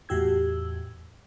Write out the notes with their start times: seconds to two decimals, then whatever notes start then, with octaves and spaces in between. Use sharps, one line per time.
0.09 E2 A2 F#4 G4 E6 G#6